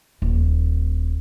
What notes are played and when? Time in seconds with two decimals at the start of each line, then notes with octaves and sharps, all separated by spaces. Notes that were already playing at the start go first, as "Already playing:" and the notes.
0.22 D#1